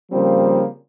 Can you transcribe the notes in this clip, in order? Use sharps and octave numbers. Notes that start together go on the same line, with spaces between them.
C#3 F3 G3 A#3 C4